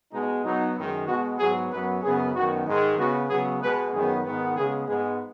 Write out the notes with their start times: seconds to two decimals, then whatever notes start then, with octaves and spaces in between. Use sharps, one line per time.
0.12 B2 G#3 B3 D#4
0.43 B2 F#3 B3 D#4
0.76 F#2 D#3 G#3
1.06 B2 G#3 B3 F#4
1.39 G#2 F#3 B3 G#4
1.70 F#2 F#3 B3 B4
2.02 F#2 C#3 B3 G#4
2.34 F#2 D#3 B3 F#4
2.65 G#2 D#3 G#3
2.97 C#3 B3 F#4
3.28 C#3 F#3 B3 G#4
3.60 B2 G#3 B3 B4
3.92 F#2 D#3 F#3 B3 G#4
4.23 G#2 D#3 B3
4.56 C#3 G#3 B3 G#4
4.87 G#2 G#3 B3 G#4